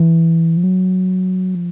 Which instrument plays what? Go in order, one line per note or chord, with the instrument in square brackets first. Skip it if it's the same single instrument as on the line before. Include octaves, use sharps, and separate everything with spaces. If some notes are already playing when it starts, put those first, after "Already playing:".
Already playing: [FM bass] E3
F3
F#3
F3